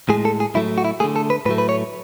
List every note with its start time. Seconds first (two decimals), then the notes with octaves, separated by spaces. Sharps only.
0.09 A2 G#3 G#4
0.25 A4
0.40 G#4
0.54 A2 F#3 A3 E4
0.78 F#4
0.85 E4
1.00 D3 A3 G#4
1.16 A4
1.30 B4
1.46 A2 B4
1.49 F#3 A3
1.58 B4
1.69 C#5